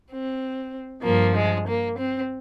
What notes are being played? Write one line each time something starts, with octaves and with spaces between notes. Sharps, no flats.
C4
G2 F3 A#3
G#3
A#3
C4